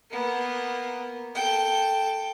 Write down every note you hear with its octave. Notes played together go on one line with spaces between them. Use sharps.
A#3 B3
A4 G5